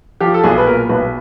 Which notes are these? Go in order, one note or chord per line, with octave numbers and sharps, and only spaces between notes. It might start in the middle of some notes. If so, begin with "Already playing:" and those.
F3 G4
A4
B1 G#4
B4
A#2 A#4
B1 B4